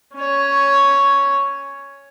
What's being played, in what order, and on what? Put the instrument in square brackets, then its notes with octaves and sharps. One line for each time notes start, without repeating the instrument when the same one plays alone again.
[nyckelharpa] C#4 C#5